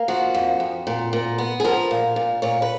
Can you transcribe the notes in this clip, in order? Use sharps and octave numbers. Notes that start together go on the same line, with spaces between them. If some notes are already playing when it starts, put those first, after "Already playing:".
Already playing: A#3
F3 F#4
F2
F2
A#2
A#2
B3
G#4
F3 A#4
A#2
A#2
A#2 C#5
B4